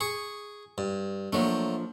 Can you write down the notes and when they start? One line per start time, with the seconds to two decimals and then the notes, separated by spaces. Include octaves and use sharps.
0.01 G#4 C#6
0.78 G2
1.33 F3 F#3 A3 A#3 D4